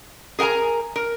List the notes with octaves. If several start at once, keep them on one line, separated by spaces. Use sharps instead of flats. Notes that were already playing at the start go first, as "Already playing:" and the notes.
G#4 A#4 F#5 G#5 A#5
A#4